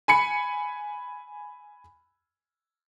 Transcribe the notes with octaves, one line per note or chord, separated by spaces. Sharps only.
G#5 B5 C#7